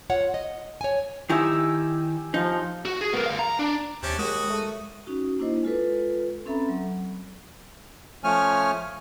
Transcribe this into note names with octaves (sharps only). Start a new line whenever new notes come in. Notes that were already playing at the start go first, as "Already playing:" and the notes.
F4 C#5 F#5
D#5
C#5 G#5
D#3 D#4 E4 G4 G#5 E6
F3 D#4
F#4
G#4
B3 A#4
D2 F5
A#5
D4
D#2 C3 C#4 D4 G4
D#2 G#3 F#4 D#6
A3
C#4 D#4 F#4
A#3 D4 E4 C5 D#5
G#3 F4 A4 B4
C4 C#4 A4 E5 A#5 B5
F#3
F3 A3 C#4 C#5 G#5 F6